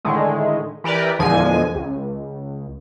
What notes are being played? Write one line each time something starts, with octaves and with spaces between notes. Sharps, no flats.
A2 D3 D#3 G#3 A3
E3 G4 A#4 B4 D5
E2 A#2 D3 F3 G#3 G#5
C#2